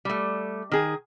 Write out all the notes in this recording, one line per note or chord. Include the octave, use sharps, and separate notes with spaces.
G3 A3
D#3 G#4